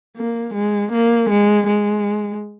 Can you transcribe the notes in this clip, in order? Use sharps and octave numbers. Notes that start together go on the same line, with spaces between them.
A#3
G#3
A#3
G#3
G#3